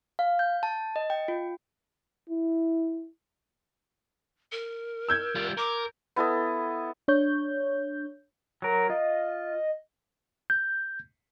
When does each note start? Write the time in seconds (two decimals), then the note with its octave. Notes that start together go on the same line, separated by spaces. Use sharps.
0.19 F5
0.39 G6
0.63 A5
0.96 D#5
1.10 G5
1.28 F4
2.30 E4
4.52 A#4
5.09 E6 G6 G#6
5.35 G3 F4
5.57 A#4 D6
6.16 B3 E4 A4 D#5
7.08 D4 C#5 G6
8.62 F#3 A#4
8.90 F4 D#5
10.50 G6